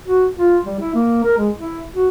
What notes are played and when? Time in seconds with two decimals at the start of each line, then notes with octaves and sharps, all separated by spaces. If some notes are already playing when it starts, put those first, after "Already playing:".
0.05 F#4
0.38 F4
0.65 G3
0.80 E4
0.94 A#3
1.24 A#4
1.38 G#3
1.55 E4
1.95 F#4